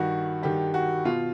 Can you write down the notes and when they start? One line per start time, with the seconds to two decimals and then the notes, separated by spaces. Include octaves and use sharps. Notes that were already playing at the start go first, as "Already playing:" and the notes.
Already playing: G2 D#3 F#4
0.42 G2 D#3 G4
0.74 F#4
1.05 B2 F4